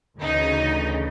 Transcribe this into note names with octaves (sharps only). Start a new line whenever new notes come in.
D2 C#3 E3 D#4